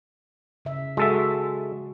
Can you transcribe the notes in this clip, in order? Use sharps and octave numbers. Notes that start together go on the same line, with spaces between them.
C#3 E5
G#3 F#4 A4 E5